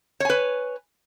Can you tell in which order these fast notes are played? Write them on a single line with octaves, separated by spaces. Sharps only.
C#5 G#5 B4